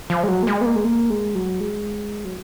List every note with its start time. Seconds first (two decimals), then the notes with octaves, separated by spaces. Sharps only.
0.10 F3
0.23 G#3
0.28 F#3
0.43 A#3
0.47 G#3
0.61 B3
0.66 A#3
0.76 G#3
0.85 A#3
1.10 G#3
1.35 F#3
1.60 G#3
2.25 F#3